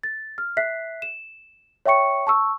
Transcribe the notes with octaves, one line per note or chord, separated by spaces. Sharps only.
A6
F6
E5 F#6 B6 C7
E7
C#5 E5 G5 C#6 C#7
A5 C#6 E6